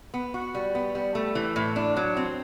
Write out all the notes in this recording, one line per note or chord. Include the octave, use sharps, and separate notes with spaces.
B3
F#4
G3
B3
G3
A3
E3
A2
D4
F#3
C4